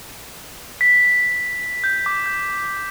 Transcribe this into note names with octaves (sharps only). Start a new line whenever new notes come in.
B6
G6
D6
G6